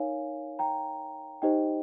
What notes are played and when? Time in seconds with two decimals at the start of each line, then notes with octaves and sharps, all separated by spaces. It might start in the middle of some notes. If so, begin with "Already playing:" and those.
Already playing: D#4 A#4 C#5 F5 G#5
0.59 G5 A#5
1.42 D#4 G4 C5 D#5 G5